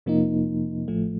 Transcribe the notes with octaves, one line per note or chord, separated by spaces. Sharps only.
F2 C3 F3 A#3 D#4
A1 A2 F3 A3